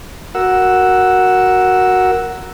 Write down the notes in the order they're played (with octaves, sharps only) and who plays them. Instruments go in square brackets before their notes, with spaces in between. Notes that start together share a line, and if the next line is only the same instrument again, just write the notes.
[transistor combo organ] F#4 A#4 F#5 E6